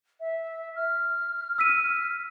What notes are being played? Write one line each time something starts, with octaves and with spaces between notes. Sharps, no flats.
E5
F6
E6 B6 D#7